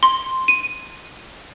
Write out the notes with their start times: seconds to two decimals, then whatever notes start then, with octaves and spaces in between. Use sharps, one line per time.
0.03 C6
0.48 D#7